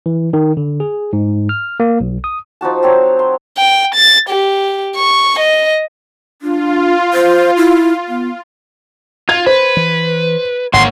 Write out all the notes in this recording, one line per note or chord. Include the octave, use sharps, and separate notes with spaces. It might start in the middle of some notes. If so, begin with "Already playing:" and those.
E3
D#3
D3
G#4
G#2
F6
A#3
B1
D#6
F3 D#4 F#4 A5
F#3 C4 C#5
C6
G5
A6
G4
C#6
D#5
D4 F4
C5
E4
B3
F4 G#6
B4 C5
E3
G#1 G#2 D3 A#3 C#5 F#5 C6